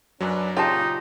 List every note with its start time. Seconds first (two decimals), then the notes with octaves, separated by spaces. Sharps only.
0.20 F#2 F#3 C#4 D4 B4
0.57 A#2 C#3 G#3 D#4 F4 G4 A5